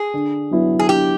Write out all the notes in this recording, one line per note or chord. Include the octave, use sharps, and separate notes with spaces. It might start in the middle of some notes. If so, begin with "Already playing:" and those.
Already playing: G#4
D3
F#3 B3 E4
G#4
D3 G4